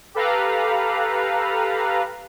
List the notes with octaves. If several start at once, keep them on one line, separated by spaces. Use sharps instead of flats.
G4 A4 B4 F5 A#5